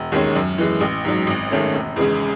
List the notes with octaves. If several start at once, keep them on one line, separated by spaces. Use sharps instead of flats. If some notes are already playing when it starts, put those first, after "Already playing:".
Already playing: E1
D#2 D#3 G#3 C#4
F#2
E3 G#3
A1
G#2 F#3
G#1
G#2 D#3 A3 C#4
E1
E2 C#3 G#3